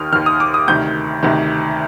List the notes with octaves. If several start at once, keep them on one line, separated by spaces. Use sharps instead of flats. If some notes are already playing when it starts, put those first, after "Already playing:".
Already playing: D#2 D#3 D#6 F6
D#2 D#3 F6
D#6
D6
D#6
D2 C3 D#3 G6
D2 C3 D#3